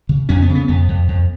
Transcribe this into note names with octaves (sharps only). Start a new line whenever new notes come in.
C#3
F2 C#4
B3
C#3
B3
F2 B3
F2
F2